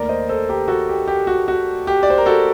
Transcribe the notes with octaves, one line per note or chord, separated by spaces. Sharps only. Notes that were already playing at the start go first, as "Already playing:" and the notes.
Already playing: D#2 D#3 A3 A#4 D5
C5 D#5
A4 C5
G4 A#4
F#4 A4
G4
G4
F#4
F#4
G4
D5
C5
A#4
F#4 A4